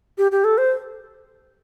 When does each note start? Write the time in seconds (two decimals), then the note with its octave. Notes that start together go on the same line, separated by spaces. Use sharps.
0.18 G4
0.32 G4
0.44 A4
0.58 C5